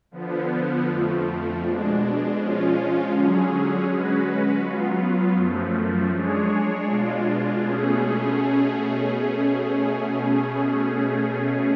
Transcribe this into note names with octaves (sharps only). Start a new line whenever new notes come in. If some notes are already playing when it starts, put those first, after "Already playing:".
D3 F3 B3
F2 F3 A3
B2 G#3 D4
F3 G#3 C#4 F4
D3 F#3 C#4 G#4
G#3 C#4 F#4 B4
F#3 B3 F4
F#2 F3 A3
G#3 D4 G#4 C#5
B2 G#3 D4 F4
B2 A3 C#4 G#4